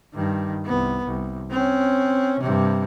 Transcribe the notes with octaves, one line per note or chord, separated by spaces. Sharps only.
G2 D#3
C2 B3
C2
C4 C#4
G2 C3